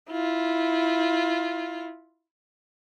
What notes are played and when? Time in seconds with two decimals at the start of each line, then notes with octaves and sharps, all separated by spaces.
0.11 E4 F4